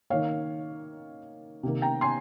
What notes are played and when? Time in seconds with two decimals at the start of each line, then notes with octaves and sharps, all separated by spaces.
0.10 D#3 A#3 C#5 F5
1.63 C3 D#3 A#3
1.82 G5 A#5
2.01 G#5 C6